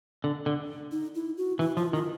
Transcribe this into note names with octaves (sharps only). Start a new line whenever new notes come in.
D3
D3
D#4
E4
F#4
E3 E4
F3 F4
D#3 F4